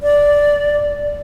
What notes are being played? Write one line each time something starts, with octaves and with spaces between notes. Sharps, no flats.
D5